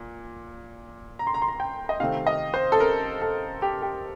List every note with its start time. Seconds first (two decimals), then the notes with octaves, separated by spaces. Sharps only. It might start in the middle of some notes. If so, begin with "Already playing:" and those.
Already playing: A#2
1.19 A#5
1.27 C6
1.34 A#5
1.42 C6
1.48 A#5
1.60 G5
1.89 D#5
2.00 C3 D#3 A3 C4 F5
2.27 D#5
2.54 C5
2.72 A4
2.80 A#4
3.22 A4
3.62 G4
3.82 G4